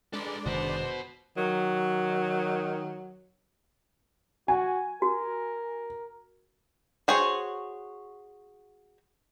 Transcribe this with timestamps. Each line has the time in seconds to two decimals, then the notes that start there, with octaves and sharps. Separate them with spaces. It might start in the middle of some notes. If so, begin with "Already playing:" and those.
0.13 G#3 D4 A4 B4 D5
0.46 F#1 C3 D#3 F#4 B4 C5
1.37 D#3 F#3
4.48 F#4 G#5
5.02 F#4 A#4
7.08 F#4 G#4 C5 C#5